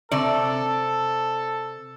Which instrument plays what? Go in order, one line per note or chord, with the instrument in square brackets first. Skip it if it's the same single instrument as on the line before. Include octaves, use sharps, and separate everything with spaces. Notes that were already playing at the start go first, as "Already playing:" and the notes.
[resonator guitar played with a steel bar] C3 D5 [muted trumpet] A4